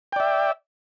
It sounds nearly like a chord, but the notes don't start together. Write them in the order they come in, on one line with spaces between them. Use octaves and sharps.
G5 D5 E5